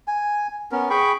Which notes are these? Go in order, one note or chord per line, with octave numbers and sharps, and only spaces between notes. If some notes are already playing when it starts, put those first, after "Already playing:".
G#5
B3 C#4 A#4
G#4 G5 B5 C#6